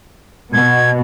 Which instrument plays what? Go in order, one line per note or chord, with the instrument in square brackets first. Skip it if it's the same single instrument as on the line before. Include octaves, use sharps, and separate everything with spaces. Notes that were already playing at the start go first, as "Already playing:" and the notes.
[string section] B2 [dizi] G#6